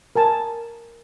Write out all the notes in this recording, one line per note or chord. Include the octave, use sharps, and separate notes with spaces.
A#4 G#5 A5